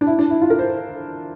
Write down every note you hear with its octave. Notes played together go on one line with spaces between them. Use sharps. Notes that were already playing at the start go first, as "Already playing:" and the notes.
D4
E4
D4
E4
F4
A#4
C5